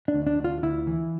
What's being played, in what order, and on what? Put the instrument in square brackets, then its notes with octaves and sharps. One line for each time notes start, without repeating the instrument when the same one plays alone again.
[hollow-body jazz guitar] D4
D2
D4
D2
F4
D2 E4
E3